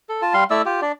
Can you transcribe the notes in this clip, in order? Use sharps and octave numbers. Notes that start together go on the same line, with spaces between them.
A4
F4 A5
G3 F5 C6
A3 E4 D5 E6
F4 G4
D4 D5